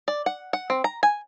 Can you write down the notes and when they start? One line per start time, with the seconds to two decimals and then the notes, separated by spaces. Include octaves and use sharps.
0.08 D5
0.26 F#5
0.53 F#5
0.70 C4
0.84 A#5
1.03 G#5